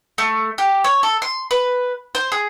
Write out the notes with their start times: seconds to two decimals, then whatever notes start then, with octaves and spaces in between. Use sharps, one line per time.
0.18 A3
0.58 G4
0.84 C#5
1.03 A4
1.22 C6
1.51 B4
2.15 C5
2.32 G#4